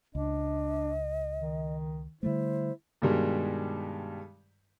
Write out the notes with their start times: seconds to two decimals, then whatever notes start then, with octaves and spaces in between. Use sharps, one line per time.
0.15 C#2 D4 D#5
1.39 D#3
2.23 D3 G3 A3 E4 C5
3.02 G2 B2 D#3 G3 G#3